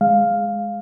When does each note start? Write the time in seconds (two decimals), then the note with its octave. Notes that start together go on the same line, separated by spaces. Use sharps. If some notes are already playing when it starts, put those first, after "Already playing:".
0.01 G#3 F5